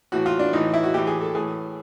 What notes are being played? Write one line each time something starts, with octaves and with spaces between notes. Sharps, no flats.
A2 E3 F#4
F4
D4
A2 E3 D#4
E4
F#4
A2 E3 G4
G#4
A4
A2 E3 G#4